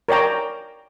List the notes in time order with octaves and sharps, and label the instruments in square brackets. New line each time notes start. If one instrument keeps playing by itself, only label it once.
[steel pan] A#4 C#5 D5 G5 A#5